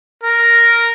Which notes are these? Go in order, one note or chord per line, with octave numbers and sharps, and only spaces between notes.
A#4